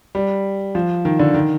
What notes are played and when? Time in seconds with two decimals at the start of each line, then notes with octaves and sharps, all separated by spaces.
0.15 G3
0.75 F3
1.05 D#3
1.19 D3
1.34 D#3